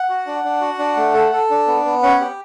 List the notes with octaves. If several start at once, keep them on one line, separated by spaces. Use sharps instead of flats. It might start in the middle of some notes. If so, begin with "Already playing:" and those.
Already playing: F#5
F#4
D4
D4
F#4
D4
A3
A4
A4
D4
B3
B3
C#4 F#5
G4